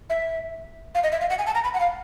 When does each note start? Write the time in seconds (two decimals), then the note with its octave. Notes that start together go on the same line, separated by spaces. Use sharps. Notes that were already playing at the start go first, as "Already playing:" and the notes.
0.10 E5
0.95 F5
1.04 D#5
1.12 E5
1.21 F5
1.30 F#5
1.39 G#5
1.46 A5
1.55 A#5
1.64 B5
1.74 F#5
1.80 F5